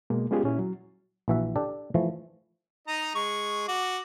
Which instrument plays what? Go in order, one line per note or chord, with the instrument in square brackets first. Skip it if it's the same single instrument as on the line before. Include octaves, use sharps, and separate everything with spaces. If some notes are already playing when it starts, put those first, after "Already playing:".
[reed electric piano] B2 G#3 A#3
G#3 B3 C#4 F4 G4 G#4
A#2 C#4 E4
F#3
[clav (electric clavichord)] A#1 E3 F#4 E5
D4 G4 A4
E3 F3 A3
[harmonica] D#4 D#5 A#5
G#3 C#6
F#4 D6